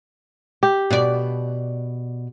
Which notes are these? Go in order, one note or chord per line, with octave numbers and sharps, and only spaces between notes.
G4
B2 D5